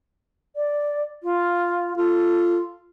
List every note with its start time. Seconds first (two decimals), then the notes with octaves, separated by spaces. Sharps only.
0.56 D5
1.23 F4
1.97 F4 A4